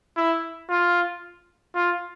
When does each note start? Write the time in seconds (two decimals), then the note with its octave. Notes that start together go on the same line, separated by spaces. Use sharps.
0.17 E4
0.69 F4
1.75 F4